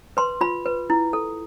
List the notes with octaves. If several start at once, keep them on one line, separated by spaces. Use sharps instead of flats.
B4 C6
F4 B5
B4
E4
A4